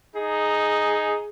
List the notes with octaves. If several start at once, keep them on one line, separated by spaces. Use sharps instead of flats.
D#4 G#4